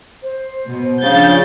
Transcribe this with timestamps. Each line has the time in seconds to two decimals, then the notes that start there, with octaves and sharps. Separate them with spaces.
0.23 C5
0.69 B2
1.03 C#3 F3 D4 F5 G6 A6